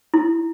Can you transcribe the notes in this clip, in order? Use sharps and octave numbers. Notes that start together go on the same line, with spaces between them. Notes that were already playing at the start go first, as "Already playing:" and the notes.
E4